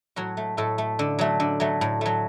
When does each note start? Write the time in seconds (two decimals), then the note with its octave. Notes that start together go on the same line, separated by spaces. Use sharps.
0.16 A2 F#3 F#4
0.37 A3
0.57 A2 A3 A4
0.78 A3
0.99 D3
1.19 F#3 A3
1.40 D3
1.60 F#3 A3
1.81 A2
2.01 F#3 A3